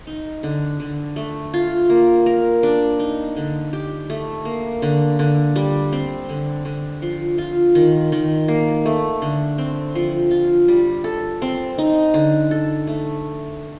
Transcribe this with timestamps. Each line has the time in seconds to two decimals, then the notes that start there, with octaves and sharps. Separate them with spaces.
0.07 D#4
0.43 D3
0.80 D3
1.16 A3
1.53 F4
1.90 A#3
2.26 A#4
2.63 D4
2.99 D#4
3.37 D3
3.73 G4
4.10 A3
4.45 A#3
4.82 D3
5.19 D3
5.56 G3
5.93 C4
6.29 D3
6.65 D3
7.02 F3
7.38 F4
7.75 D#3
8.12 D#3
8.48 A#3
8.86 A3
9.22 D3
9.58 C4
9.95 F3
10.31 F4
10.68 G3
11.04 A4
11.42 C4
11.78 D#4
12.14 D3
12.51 A4
12.87 A3